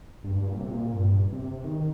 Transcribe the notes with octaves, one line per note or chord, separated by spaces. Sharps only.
G2
G2
A#2
C3
A#2
G2
C3
C3
D#3